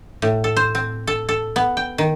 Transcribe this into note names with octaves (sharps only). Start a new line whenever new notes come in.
A2
A4
C5
C4
A4
A4
B3
G5
D#3